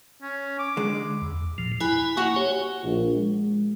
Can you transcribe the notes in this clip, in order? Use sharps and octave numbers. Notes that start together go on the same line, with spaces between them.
C#4
D6
D3 G#3
E2
A#2 F3
E4 B4 G#5
A#3 F#4 F#5 C#6
G4 C#5 G#5
A#1
G#3